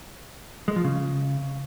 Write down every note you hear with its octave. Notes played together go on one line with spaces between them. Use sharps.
G#3
F3
C#3